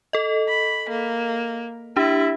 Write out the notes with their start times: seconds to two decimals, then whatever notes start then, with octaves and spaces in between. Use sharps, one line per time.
0.13 A4 D#5
0.49 B5
0.89 A#3
1.97 D4 E4 G4